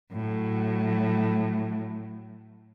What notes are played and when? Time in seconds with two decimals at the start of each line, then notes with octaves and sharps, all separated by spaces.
0.12 A2 F#3